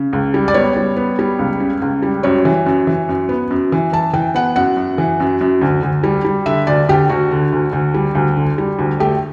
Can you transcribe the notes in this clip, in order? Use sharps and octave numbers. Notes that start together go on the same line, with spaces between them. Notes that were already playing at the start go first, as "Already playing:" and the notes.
Already playing: C#3
C#2
G3
D5
B3 C#5
G3
B3
G3
C#2
C#3
C#2
G3
F#2 C#5
E3
F#2
E3
F#2
B3
F#2
E3
E3 A5
E3 G5
B3 F#5
F#2 F#5
F#2
E3
F#2
F#2
D2
D2
G3
G3
D3 E5
D2 D5
D2 G4
D2 F#4
D3
D2
D2
G3
D2
D3
G3
D2
A3 G4